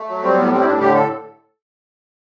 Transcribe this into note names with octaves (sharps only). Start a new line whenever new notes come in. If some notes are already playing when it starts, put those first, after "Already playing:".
Already playing: A3
F#3
G3 C4
A2 B3
G3 C4
E4
A2 D4
D3 G4
A4